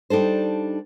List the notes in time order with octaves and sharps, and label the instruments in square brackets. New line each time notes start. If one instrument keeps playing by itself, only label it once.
[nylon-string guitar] G3 D4 D#4 A4 C5